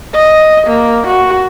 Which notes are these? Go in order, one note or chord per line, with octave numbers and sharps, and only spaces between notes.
D#5
A#3
F#4